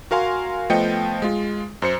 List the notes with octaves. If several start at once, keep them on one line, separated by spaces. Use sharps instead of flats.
F#4 A#4 F5 G#5 C6
F3 A3 B3 D#5 G5 C#7
G#3 F4
F#2 C5 C#7